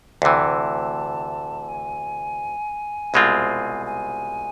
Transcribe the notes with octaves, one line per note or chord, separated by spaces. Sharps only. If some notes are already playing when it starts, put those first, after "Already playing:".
D2 C3 E3 A5
G#5
C2 B2 G#3 C4 F4
G#5